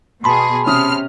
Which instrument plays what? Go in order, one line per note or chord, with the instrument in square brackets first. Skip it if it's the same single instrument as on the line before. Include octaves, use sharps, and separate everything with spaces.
[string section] B2 G#4 [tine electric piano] A5 B5 C6
[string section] C3 F6 [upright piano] C#4 D#6